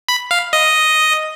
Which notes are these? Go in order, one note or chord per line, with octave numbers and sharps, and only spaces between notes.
B5
F5
D#5